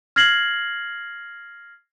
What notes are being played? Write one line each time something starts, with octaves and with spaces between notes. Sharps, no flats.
F6 G#6 A#6 C7 F#7